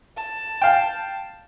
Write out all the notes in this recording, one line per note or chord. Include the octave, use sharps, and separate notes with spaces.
A5
F5 G5